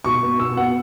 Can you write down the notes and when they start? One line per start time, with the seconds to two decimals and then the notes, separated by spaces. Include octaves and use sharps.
0.04 B2 C#6
0.23 B3
0.40 B2 E6
0.57 B3 F#5